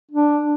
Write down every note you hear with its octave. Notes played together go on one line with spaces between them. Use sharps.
D4